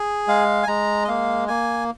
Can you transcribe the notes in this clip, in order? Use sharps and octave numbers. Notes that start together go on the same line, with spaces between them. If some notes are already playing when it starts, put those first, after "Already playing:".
Already playing: G#4
G#3 F5
G#5
G#3 A#5
D#5
A#3 F5
A#3 G#5